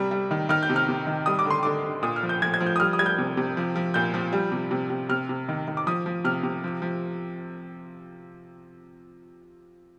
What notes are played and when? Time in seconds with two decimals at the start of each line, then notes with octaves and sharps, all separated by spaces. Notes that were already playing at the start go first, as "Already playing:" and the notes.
Already playing: C3 G3
0.11 G3
0.31 D#3
0.49 D#3 F6
0.63 G6
0.70 C3
0.76 F6
0.89 C3
1.07 D#3
1.26 G3 D#6
1.39 D6
1.45 D3
1.50 C6
1.63 D3 D6
1.85 D3
2.03 A#2 D#6
2.16 F6
2.23 F3
2.29 G6
2.42 F3 G#6
2.54 G#6
2.60 F3
2.66 G6
2.76 D#6
2.80 G3 F6
2.93 D#6
2.99 G3 G#6
3.06 G6
3.18 C3
3.37 C3
3.57 F3
3.76 F3
3.94 A#2 G6
4.14 F3
4.33 G3
4.52 C3
4.71 C3
4.90 C3
5.09 C3 F6
5.29 C3
5.49 D#3
5.68 D#3
5.77 D6
5.87 F3 D#6
6.06 F3
6.24 C3 F6
6.43 C3
6.64 F3
6.82 F3